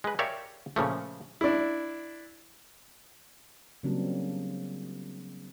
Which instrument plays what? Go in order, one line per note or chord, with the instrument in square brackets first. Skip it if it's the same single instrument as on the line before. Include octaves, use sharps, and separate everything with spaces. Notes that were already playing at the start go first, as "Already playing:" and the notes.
[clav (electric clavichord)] G#3 B4
G4 A#4 C#5 D5 E5 F5
A#2 C#3 F3 A3
[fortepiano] D4 E4
[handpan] C#3 F#3 G3 A#3 C4 D4